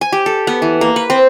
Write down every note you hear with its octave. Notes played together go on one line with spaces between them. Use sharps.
G#5
G4
A4
B3
E3
A#3
B4
C4